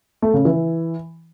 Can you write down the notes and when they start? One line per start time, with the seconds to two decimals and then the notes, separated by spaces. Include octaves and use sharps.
0.22 A3
0.34 C#3
0.45 E3